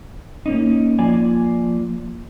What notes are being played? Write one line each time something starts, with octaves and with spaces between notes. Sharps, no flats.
A#3 C#4 D#4
F3 A#3 F4 D5 G#5